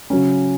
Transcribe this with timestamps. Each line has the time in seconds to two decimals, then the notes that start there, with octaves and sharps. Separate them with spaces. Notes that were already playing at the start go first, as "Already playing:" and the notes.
0.10 C#3 F#3 C#4